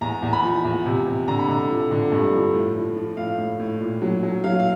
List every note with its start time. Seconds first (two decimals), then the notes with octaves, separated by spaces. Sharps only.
0.01 E2 A#5
0.22 E2
0.33 B5
0.43 F3
0.64 E2
0.86 C3
1.06 C3
1.28 D3 A#5
1.39 B5
1.49 D3 A#5
1.70 F3
1.91 D3
2.12 G2
2.33 F3
2.54 A2
2.76 F3
2.96 F3
3.17 A2 F5
3.38 A2
3.60 A2
3.80 A#2
4.02 F#3
4.23 F#3
4.44 F#3 F5
4.60 F5